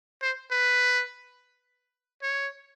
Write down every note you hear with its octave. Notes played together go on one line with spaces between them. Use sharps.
C5
B4
C#5